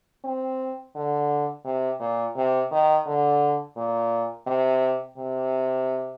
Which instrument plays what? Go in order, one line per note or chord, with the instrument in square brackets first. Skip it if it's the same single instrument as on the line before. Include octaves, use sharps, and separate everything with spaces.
[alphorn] C4
D3
C3
A#2
C3
D#3
D3
A#2
C3
C3